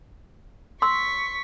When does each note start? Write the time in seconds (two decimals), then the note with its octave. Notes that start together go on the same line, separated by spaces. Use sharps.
0.82 C6 C#6 E6 B6